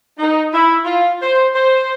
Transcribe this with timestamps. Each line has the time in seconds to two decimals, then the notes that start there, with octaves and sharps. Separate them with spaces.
0.18 D#4
0.53 E4
0.85 F4
1.22 C5
1.55 C5